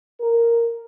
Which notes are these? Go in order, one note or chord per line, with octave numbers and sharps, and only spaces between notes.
A#4